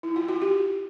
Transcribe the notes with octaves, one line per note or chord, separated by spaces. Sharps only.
E4
F4
F#4
G4